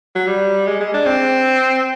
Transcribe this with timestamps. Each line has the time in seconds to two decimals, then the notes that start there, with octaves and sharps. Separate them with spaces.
0.15 F#3
0.27 G3
0.66 G#3
0.80 G#3
0.94 D4
1.06 C4